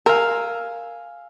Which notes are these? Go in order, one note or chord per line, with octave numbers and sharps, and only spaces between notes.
A#4 F5 G#5 E6